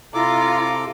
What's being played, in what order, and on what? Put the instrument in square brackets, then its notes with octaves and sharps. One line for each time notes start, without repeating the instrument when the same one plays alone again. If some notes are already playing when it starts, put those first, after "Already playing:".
[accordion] C3 A4 D6 [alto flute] E4 [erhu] F4 [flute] A#5